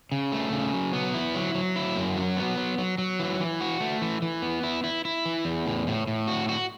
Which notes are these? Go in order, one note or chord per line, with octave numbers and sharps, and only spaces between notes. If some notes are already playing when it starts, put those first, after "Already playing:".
C#3
A3
C#3
F#3
B3
E4
F#3
F#3
E4
F#2
F#3
B3
F#3
F#3
F#3
E3
E3
F#4
A3
E3
E3
B3
E4
E4
E4
E3
E2
A2
A2
A2
F#4
F#4